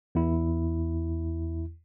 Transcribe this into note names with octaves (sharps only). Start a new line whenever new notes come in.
E2 E4